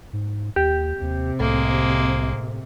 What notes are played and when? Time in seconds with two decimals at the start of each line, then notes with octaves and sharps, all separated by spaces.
0.13 G#2
0.56 D#2 G4
1.01 D#2 C3
1.40 C2 A2 G#3 A#3